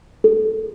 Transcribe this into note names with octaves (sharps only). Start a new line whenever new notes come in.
A4